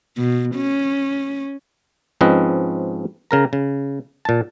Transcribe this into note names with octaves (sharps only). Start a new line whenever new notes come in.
B2
C#4
G#2 F3 C4 C#4 B4 D#5
C#3 A#4 A#5
C#3
A#2 A5